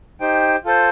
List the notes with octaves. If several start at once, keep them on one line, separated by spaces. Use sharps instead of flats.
D#4 G4 C5 G5
F4 A4 C5